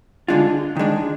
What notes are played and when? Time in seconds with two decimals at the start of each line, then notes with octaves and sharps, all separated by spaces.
0.28 D3 G#3 D4 F4
0.77 D#3 G#3 D4